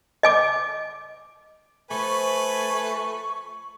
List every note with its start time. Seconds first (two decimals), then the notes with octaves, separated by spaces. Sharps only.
0.23 D#5 G#5 D6
1.91 F3 A3 B4 G#5 C#6